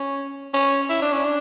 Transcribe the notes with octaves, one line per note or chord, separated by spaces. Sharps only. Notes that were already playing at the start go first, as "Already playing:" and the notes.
Already playing: C#4
C#4
E4
D4
C#4
D4